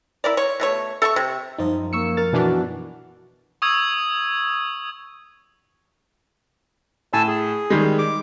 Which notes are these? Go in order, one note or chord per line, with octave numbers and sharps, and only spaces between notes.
E4 A#4 D5
C#5
B2 A3 C#5
A4 E5 A5 C#6
C3
F#2 F3 G3 D#4 C5 D#5
A#3 C#6 E6 C#7
D#4 A#4 F6 A6
B2 E3 D4 F#4
C#6 D#6 E6 G#6
A2 G#5 A5 E6
G#4
D#3 G3 G#3
D6